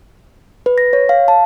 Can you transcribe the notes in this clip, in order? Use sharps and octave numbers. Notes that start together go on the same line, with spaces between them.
B4
A#6
C#5
F5
A5